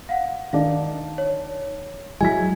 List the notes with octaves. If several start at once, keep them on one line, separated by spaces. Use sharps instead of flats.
F5 F#5
D#3 D4 D#4 F5
C#5
F#3 G#3 E4 G#5 G#6 B6